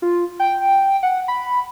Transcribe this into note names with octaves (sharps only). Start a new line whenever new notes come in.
F4
G5
F#5
B5